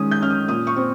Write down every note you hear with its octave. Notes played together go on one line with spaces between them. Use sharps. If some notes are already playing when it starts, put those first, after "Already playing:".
Already playing: D#3 G#3 C#4 D#6
G6
C#4 F6
D#6
A#2 D#6
C#6
C4